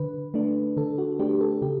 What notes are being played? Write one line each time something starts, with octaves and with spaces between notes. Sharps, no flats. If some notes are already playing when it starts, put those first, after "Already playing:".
Already playing: D3 B4
A3 D4
D3 A4
F#4
A3 D4 G4
A4
C#3 G4